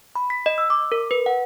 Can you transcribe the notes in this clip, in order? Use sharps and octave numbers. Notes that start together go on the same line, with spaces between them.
B5
B6
D#5
E6
D6
A#4
B4
F#5